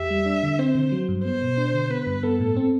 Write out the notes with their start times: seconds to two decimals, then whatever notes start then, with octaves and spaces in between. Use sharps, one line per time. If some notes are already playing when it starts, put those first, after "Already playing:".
Already playing: E2 G4 E5
0.11 G3
0.26 D4
0.43 D3
0.59 C4 C5
0.75 D3
0.92 F#3
1.09 G2
1.25 B3 C5
1.42 B2
1.57 D4
1.74 D3
1.90 B3 B4
2.07 G2
2.23 B3 A4
2.40 A2
2.57 C4